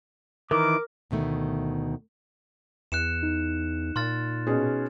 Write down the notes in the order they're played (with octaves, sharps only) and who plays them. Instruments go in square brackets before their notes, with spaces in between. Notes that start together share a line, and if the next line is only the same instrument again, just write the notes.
[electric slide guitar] D#3 E3 [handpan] A#4 [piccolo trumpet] D6
[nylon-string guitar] D2 B2 D#3 A3
[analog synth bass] E2 [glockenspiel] F#6 C#7 E7
[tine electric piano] D#4
[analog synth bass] A#2 [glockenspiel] C6 F6 A6
[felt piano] B2 C#4 G#4